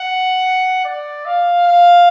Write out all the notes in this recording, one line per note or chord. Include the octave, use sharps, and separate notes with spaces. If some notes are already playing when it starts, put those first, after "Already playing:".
Already playing: F#5
D5
F5
F5